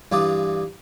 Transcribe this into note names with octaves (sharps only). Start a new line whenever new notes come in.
G2 E3 F4 D5 D#6